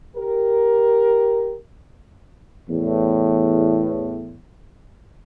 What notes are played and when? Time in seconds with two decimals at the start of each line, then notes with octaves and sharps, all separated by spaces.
0.16 G4 A#4
2.69 E2 A2